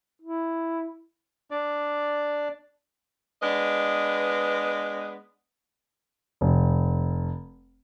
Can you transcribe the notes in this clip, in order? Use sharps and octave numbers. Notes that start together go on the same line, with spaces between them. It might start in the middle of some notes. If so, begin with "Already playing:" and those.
E4
D4 D5
G#3 B3 D4 B4 D#5
F1